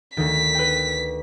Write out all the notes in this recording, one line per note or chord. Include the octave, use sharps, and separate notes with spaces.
D2 D#3 B6
B4 G5